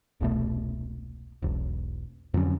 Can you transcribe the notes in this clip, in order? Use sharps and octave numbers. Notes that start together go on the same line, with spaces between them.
E1 C2 B2 A3
E1 B1
F2 D3 F#3 C#4